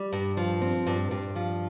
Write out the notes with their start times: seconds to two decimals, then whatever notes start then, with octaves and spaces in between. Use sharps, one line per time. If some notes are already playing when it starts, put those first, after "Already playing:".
Already playing: G3
0.13 G2
0.37 F3
0.62 C4
0.87 G2
1.11 G2
1.35 F3